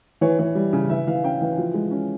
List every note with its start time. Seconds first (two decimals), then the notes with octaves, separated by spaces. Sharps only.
0.21 E3 C#5
0.39 E3
0.55 G3
0.73 C#3
0.90 E3 E5
1.07 E3 F5
1.24 C#4 G5
1.41 E3
1.58 F3
1.74 G#3
1.91 C#4